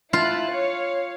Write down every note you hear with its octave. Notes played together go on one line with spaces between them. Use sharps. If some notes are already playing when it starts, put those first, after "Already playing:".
E4 F4 A5 F#6
C#5 F5